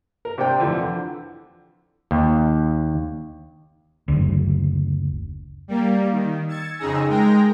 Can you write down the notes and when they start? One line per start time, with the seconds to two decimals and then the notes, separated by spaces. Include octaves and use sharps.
0.25 A#4
0.38 C3 D4 C5 G5
0.60 F2 D3 E3
2.11 D#2
4.08 F#1 D2
5.68 G3 A#3
6.12 D#3
6.48 E6 G#6 A6 C#7
6.78 F2 C#3 D#4 G#4 E6 A#6
7.09 G#3 A#4 G5 A#6